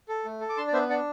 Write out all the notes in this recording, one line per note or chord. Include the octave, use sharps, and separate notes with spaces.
A4
A3
A4
D6
D4 A5 C6
D5
B3 C5 E5
D4 D5 F#5